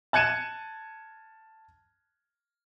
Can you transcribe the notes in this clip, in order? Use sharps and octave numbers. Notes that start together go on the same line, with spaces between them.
A5 F#6 G#6 C#7 D#7 E7